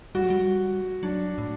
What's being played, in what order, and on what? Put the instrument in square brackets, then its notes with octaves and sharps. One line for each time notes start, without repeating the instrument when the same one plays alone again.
[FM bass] G3 [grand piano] F#4
[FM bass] F#3
G3
[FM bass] F#3 [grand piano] D4
[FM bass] A2